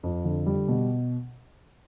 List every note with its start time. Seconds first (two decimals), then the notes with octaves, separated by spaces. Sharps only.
0.03 F2
0.25 D3
0.46 G3
0.68 B2